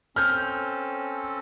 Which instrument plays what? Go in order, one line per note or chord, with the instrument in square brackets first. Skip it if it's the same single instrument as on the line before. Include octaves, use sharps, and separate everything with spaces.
[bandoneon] C4 C#4 A4 [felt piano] F6 G6